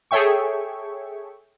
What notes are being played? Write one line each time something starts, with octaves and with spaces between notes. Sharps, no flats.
G#4 A4 C#5 E5 G5 C#6